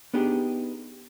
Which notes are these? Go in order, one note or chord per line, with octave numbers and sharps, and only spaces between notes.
B3 D4 D#4 G4 G#4